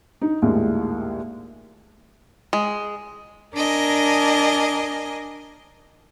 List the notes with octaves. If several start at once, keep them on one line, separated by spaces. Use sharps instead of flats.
D#4
A#1 D#2 A2 G#3
G#3
D4 A#4 D#5 G#5